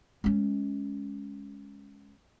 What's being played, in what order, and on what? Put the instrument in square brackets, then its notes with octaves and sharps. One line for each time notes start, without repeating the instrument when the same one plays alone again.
[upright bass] G#3 C#4